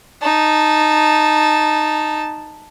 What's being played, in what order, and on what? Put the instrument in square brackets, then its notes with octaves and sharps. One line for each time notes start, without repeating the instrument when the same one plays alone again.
[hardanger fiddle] D#4 A5